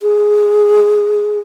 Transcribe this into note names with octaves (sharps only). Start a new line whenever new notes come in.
G#4